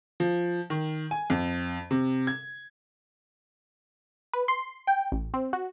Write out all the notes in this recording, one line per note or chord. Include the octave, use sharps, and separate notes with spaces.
F3
D#3
G#5
F2
C3
G#6
B4
C6
G5
A1
C4
F#4